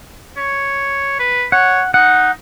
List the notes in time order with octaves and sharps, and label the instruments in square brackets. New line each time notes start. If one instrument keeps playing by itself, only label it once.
[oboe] C#5
B4
[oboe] C#5 [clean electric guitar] F#5
[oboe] D#4 [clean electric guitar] F#5